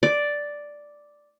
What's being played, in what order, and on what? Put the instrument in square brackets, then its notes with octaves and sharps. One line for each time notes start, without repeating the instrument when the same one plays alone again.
[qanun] D5